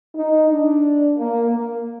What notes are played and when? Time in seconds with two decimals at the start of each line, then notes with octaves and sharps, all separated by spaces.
0.15 D#4
0.50 D4
1.17 A#3
1.50 A#3